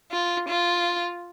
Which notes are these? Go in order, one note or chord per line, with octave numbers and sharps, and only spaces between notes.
F4
F4